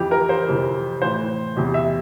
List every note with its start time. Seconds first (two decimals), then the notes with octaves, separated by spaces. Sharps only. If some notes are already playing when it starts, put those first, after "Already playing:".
Already playing: F2 E3 G4
0.11 A#4
0.29 C5
0.48 F2 C3 E3
1.02 A2 E3 C5
1.56 E2 C3 E3
1.74 E5